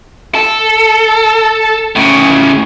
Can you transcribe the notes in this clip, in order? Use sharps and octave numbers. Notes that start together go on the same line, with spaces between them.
A4
A2 C#3